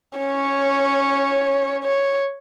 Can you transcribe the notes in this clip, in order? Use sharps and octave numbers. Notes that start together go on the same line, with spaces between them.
C#4 C#5
C#5